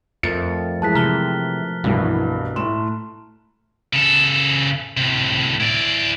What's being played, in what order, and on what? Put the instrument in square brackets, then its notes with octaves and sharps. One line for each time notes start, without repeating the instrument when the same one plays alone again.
[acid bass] F2 [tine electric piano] F3 A3 A#4 [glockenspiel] A6 [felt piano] C#7
[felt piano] E3 G#3 [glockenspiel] A5 F#6 B6
[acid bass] C3 [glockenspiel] A#5 F6 G7
[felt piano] C2 G2 E3 [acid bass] B2
[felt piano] A2 E7 [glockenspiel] C6
[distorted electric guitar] C#3 A4
A2 C3
E4 D5